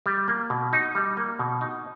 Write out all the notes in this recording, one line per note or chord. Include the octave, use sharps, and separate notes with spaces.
G3
A#3
B2
D#4
G3
A#3
B2
D#4